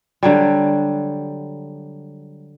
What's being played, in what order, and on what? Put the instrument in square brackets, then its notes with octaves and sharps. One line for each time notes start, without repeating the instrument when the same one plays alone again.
[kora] D3 F#3 G3